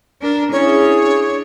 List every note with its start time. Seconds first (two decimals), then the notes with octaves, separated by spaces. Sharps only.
0.22 D4 A#4
0.52 C#4 D4 E4 G#4 C#5
1.03 D4